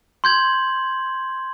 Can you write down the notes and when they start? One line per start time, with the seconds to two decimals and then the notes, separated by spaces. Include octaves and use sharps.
0.24 C6 G6 G#6 F#7